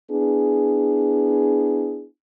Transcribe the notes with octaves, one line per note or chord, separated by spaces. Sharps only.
B3 D4 E4 G#4